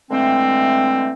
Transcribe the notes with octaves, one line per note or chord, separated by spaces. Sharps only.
D3 E3 G#3 A3 C4